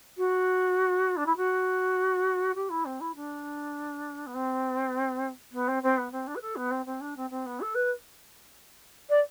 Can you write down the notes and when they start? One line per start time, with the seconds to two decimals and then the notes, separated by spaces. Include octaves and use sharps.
0.17 F#4
1.17 D4
1.26 E4
1.37 F#4
2.55 G4
2.70 E4
2.85 C4
3.00 E4
3.15 D4
4.26 B3
4.34 C4
5.52 B3
5.68 C4
5.83 C4
5.97 B3
6.11 C4
6.27 D4
6.35 B4
6.41 A4
6.56 B3
6.71 C4
6.86 C4
7.01 D4
7.16 C4
7.30 C4
7.46 B3
7.61 A4
7.75 B4
9.09 D5